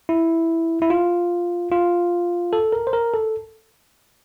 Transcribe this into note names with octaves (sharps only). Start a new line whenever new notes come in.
E4
E4
F4
F4
A4
A#4
C5
A#4
A4